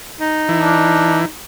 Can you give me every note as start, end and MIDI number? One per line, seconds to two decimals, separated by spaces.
0.20 1.26 63
0.49 1.25 52
0.61 1.17 62